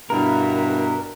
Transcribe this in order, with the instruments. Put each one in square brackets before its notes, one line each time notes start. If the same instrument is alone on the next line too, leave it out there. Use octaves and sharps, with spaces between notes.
[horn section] G2 B2 E4 [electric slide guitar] A#4